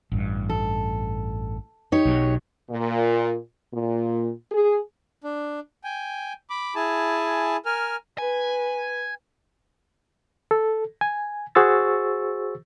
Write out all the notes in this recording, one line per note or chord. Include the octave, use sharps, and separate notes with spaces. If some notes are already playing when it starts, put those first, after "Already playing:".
A1 G2
A4
D#4 G4 C#5
B1 B2 F#3
A#2
A#2
G#4
D4
G5 G#5
B5 D6
E4 G#4 G#5 A5
A#4 G#5 F6
B4 G#5
A4
G#5
F#4 G#4 C5 C#6 E6 A6